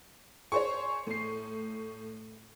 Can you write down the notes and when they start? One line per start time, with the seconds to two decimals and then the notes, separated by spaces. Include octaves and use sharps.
0.52 G#4 C5 C#5 C#6
1.07 A2 C7